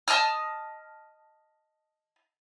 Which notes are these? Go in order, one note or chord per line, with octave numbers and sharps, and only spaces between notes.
D#5 A5 D#6 F6